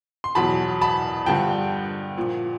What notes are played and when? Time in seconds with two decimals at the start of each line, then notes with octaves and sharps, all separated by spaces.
0.24 C6
0.35 E2 B2 F#3 A5 B5
0.81 A5 B5
1.26 G2 D3 F3 G5 A5
2.17 A#2 F3